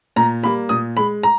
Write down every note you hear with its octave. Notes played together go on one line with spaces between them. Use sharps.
A#2 A#5
G3 A#3 B5
A#2 D#6
G#3 B5
A#5